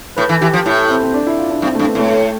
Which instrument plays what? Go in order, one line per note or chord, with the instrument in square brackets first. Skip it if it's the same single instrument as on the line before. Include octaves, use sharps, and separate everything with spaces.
[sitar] A2 [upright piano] B4
[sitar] E3
[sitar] E3 [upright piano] G4
[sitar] F3
[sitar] A2 [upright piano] E4
[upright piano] C4
C4
D4
E4
F4
D4
[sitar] G2 [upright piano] C4
[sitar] G2 [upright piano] A3
[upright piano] B3
[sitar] A2 [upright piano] A3